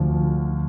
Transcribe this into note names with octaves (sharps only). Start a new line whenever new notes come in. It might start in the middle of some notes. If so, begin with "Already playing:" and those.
Already playing: D2 D3 F3